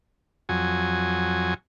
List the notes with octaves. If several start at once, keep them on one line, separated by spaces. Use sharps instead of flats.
F2 F#3 G#5